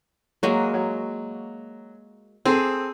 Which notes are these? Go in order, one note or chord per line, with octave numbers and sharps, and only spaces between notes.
F#3 G#3 A#3 F#4
F#3
C4 G#4 A4